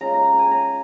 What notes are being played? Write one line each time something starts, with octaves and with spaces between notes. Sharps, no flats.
G#3 C#4 F4 A#5
A#5
A#5
G#5
A#5